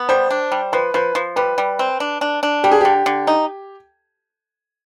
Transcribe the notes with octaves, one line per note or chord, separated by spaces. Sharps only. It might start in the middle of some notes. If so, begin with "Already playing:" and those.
Already playing: B3
G3 C5
D4
G3
F3 B4
F3 B4
F3
G3 B4
G3
C4
D4
D4
D4
G3 G4
G#4
D3 G4
D3
D#4